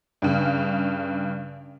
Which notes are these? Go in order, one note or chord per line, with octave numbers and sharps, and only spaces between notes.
G2 C#3